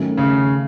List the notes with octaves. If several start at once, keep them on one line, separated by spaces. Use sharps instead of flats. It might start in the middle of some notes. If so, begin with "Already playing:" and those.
Already playing: D#3 F#3 A3 C#4
C#3